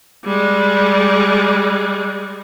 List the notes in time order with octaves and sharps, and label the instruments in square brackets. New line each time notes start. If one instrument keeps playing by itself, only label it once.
[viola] G3 G#3